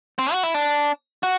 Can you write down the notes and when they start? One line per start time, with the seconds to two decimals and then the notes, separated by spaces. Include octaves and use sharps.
0.19 C4
0.32 F#4
0.43 E4
0.54 D4
1.23 F#4